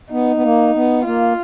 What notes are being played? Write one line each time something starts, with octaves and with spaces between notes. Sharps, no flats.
B3 D#4
B3
A#3
B3
A#3 F4